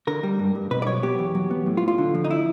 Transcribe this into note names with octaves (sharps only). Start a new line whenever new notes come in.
D3 A#4
G3
G2
G2
B2 B4
D5
F#3 C#5
B3 G4
E2
F#3
B3
A2
F4
A2
F4
D3
F3
D#4
E4